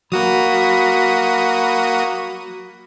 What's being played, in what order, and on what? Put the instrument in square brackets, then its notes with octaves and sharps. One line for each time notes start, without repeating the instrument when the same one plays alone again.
[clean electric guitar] F#3 [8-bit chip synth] A#3 F#4 D#6 [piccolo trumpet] B5